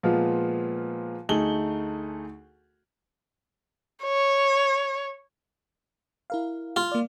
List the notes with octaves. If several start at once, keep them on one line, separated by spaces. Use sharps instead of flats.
A#2 F3 G#3 B3 F4
D2 A3 D#4 G#4 F#7 G7
C#5
E4 A#4 F5
F4
A#3 D5